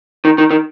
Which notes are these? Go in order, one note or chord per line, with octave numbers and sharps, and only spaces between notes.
D#3
D#3
D#3